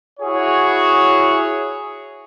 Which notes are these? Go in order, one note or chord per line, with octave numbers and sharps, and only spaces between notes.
E4 F#4 G#4 C#5